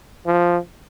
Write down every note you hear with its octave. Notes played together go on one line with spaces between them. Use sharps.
F3